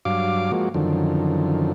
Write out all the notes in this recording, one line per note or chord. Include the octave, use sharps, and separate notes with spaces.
G2 F#3 F5 D6
F3 G#3 A#3 F#4
F#2 D3 D#3 F3